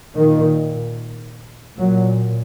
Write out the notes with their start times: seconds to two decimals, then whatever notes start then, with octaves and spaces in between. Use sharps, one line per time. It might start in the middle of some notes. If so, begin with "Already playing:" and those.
0.18 A#2 D#3
1.79 A#2 F#3